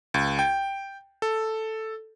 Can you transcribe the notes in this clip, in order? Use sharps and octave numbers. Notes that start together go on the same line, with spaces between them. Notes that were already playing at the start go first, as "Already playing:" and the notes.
C#2
G5
A4